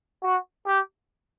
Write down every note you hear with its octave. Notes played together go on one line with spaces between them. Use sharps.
F#4
G4